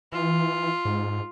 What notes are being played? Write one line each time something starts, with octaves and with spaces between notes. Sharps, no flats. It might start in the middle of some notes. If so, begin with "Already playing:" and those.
E3 F4
G#2